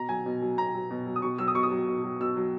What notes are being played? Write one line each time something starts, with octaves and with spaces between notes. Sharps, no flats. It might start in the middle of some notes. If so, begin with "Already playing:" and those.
Already playing: B2 A#5
F#3 G#5
B2
F#3
B2 A#5
F#3
B2
F#3
D#6
B2 C#6
F#3 E6
D#6
B2 C#6
D#6
F#3
B2
F#3
B2 E6
F#3